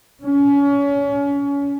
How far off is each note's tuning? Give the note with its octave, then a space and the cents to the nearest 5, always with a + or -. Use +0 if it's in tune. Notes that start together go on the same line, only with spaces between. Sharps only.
C#4 +30